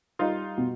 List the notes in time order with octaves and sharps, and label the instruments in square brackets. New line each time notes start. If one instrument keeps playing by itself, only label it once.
[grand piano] G3 [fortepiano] D#4 F4
[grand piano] B2